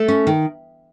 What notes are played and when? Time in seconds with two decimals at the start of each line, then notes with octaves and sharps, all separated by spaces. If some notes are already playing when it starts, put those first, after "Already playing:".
Already playing: A3 A4
0.08 C#4
0.27 D#3